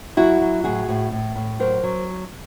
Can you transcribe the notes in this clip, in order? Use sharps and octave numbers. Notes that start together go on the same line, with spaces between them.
F#3 E4 F#4
F#3
A2 F#4 G#4
A2
A2
A2
F#3 A#4 C5
F#3